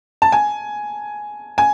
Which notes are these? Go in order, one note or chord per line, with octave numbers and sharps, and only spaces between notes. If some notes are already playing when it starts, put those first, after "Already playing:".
A5
G#5
G#5